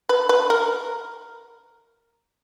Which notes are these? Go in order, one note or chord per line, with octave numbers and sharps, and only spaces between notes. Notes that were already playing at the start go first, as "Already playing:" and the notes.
B4
B4
A#4